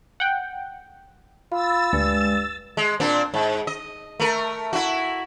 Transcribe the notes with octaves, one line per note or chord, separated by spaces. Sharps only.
F#5 G5
F4 B5 E6 A6
D2 G2 G#3
G#3
A#2 C4 D4
G#2
D#5
A3 A#4
E4 F#4